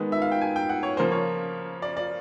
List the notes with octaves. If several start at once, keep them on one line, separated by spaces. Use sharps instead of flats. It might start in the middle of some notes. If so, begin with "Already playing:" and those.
Already playing: D#3 G#3 B3
E5
F5
G5
G#5
G5
F#5
C#5
C#3 F3 A#3 C5
C#5
D5
D5